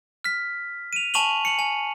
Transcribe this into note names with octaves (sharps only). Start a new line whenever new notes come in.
F6 B6
D#7 F7
G#5 A5 C#6 D#7 F7 F#7
C#7 F#7
G#5